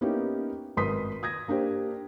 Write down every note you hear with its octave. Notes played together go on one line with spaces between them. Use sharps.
A#3 B3 C#4 D#4 E4 G4
G#1 A#4 B4 C6 D#6 B6
D#6 G#6 A#6
A#3 D4 G4 C5